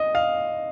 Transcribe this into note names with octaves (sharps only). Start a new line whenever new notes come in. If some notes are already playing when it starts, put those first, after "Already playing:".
Already playing: D#5
F5